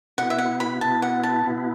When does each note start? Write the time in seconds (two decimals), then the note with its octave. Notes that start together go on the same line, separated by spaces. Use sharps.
0.18 B2 B3 E4 F#5
0.30 E5
0.38 F#5
0.60 B5
0.81 B2 B3 E4 A5
1.02 F#5
1.23 A5
1.44 B2 B3 E4